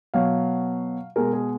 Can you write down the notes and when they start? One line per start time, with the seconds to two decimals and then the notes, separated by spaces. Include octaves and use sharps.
0.14 B2 F#3 F5
1.16 B2 G#3 A#4
1.33 G#4